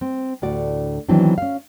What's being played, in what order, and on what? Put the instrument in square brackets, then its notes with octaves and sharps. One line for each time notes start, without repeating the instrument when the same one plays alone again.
[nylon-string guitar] C4
D2 A2 F#4 D5
D#3 E3 F#3 B3 C4 D4
C#4 F5